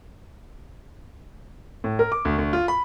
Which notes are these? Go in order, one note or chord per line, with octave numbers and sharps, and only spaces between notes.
A2
A#4
D6
D2
D2
F4
B5